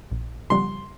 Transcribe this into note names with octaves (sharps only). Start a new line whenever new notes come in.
A#1
C#3 F3 G3 C6